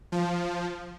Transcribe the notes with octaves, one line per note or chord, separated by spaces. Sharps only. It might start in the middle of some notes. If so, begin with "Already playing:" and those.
F3